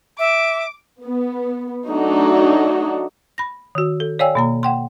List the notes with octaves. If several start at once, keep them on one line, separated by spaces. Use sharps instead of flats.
E5 D6
B3
F#3 A3 D4 D#4 F#4
B5 A#6
D#3 F#4
A4
C#5 D5 F5 G5 G#5 E6
B2 A#3 A#5
F#5 G5 C6